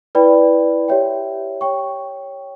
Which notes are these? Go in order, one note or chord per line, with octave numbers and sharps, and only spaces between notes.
E4 B4 D5 G5 B5
G4 C#5 E5 G5
C#5 G5 C#6